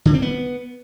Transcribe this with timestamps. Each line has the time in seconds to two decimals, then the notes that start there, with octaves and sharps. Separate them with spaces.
0.05 D3
0.14 C4
0.22 B3